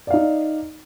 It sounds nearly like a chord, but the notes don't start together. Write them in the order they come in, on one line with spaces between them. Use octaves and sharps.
D5 F5 D#4